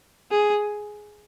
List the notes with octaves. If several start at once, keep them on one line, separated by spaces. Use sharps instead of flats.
G#4